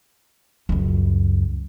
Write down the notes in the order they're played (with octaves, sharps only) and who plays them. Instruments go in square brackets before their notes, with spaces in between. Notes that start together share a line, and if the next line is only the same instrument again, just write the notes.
[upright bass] C#2 F#2